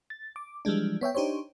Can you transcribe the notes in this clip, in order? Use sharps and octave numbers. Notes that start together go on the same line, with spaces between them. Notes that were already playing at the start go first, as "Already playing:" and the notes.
A6
D6
E3 F3 G3 G#3 D4
B3 C#5 E5 G5
D4 D#4 G4 C5 C#5